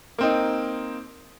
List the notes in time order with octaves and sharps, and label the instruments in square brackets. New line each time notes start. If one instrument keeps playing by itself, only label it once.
[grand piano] A#3 C4 D#4